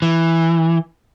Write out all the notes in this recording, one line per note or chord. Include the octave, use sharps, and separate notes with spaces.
E3